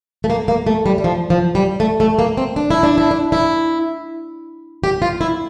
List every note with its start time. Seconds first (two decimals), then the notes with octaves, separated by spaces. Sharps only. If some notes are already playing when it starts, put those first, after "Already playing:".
0.24 A3
0.30 A#3
0.48 A#3
0.67 A3
0.86 G3
0.98 G3
1.04 F3
1.30 F3
1.55 G3
1.80 A3
2.00 A3
2.19 A#3
2.37 C4
2.56 D4
2.71 E4
2.83 D4
2.98 E4
3.11 D4
3.32 E4
4.84 G4
5.02 F4
5.21 E4